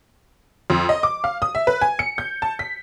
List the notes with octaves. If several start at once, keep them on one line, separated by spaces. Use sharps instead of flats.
F2
D#5
D6
F5
D#6
E5
B4
G#5
C#7
G6
A5
B6